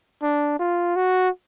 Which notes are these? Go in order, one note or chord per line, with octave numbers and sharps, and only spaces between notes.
D4
F4
F#4